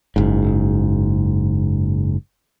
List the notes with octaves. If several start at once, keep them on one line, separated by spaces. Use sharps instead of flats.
F#1 G#2